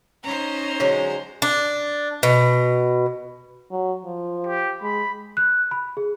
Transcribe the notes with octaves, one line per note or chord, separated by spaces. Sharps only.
C#4 D#4 C5 A#5
D3 F#3 G#3 C#5
D4
B2
F#3
F3
G4
G#3 B5
F#6
B5
G#4